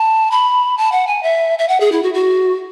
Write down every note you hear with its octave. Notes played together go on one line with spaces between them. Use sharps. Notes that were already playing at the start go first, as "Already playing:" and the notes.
Already playing: A5
B5
A5
F#5
G#5
E5
E5
F#5
G#4
E4
F#4
F#4